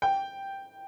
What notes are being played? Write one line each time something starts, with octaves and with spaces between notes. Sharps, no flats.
G5